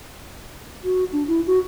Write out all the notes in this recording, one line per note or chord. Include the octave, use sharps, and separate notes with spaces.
F#4
D4
E4
F#4